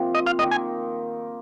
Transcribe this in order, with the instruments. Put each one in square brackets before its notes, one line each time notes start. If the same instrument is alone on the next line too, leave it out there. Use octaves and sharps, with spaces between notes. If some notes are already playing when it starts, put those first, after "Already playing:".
Already playing: [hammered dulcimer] C3 F3 A#3 C4
[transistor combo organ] D#5
F5
[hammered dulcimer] D#3 A#3 D#4 [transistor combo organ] D#5
[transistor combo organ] G#5